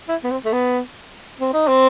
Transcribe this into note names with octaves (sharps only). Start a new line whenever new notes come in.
E4
B3
C4
A3
B3
C4
D#4
C4